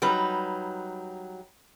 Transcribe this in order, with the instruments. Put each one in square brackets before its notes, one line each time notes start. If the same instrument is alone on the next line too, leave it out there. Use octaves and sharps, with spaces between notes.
[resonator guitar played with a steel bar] F#3 G3 D#4 B4